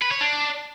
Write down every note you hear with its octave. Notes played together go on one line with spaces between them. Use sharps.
B4
C#5
D4